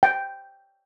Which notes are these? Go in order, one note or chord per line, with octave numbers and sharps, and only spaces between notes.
G5